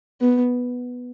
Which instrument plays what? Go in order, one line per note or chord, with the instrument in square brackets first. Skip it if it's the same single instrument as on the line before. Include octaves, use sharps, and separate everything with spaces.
[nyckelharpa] B3